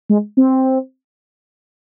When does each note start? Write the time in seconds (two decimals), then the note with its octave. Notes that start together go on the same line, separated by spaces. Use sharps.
0.10 G#3
0.37 C4